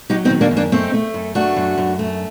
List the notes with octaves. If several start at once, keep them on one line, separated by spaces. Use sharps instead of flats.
F#3 D#4 G4
C4 D#4
D#3
A#3 D4
F#2
A#3 D4
A3 C4 D#4
A3
F#2
A3 D4 F#4
F#2
F#2
A3